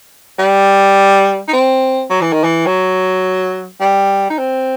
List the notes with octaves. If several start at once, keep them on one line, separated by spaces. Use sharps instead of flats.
G3
D#4
C4
F#3
E3
D#3
E3
F#3
G3
D#4
C4